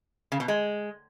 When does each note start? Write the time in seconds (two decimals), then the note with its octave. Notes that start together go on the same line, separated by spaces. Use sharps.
0.32 C#3
0.40 B2
0.48 G#3